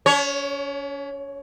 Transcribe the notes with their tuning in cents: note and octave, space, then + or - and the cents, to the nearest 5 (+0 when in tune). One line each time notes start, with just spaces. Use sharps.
C#4 +40 C#5 +0